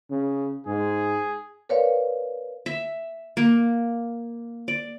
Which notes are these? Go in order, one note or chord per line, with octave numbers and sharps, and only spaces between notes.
C#3
G#2 G#4
A#4 B4 C#5 D5 F5
E5
A#3
D5